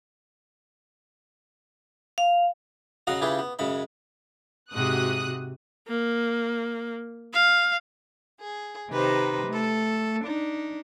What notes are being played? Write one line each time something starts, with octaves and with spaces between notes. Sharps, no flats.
F5
C#3 F#3 F#4 D#5 F5 F#5
C#3 E4 F4 G4 G#4 B4
B3
F#2 C#3 G#3 B5
G#2 C3 F#4 D#6 F#6
A#3
F5
G#4
C3 D#3 D#4 G4 B4 C5
A3 A4
D4 D#4